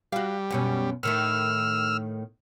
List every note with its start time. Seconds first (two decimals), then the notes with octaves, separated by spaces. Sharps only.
0.12 G3 F#4 F5
0.50 F#2 B2 C#4
1.03 A2 D#3 A3 E6 F6